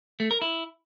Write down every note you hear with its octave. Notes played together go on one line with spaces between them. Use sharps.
A3
A#4
E4